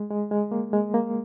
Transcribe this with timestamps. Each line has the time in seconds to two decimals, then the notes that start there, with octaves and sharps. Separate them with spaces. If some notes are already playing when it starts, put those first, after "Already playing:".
Already playing: G#3
0.10 G#3
0.31 G#3
0.52 A#3
0.73 G#3
0.94 A#3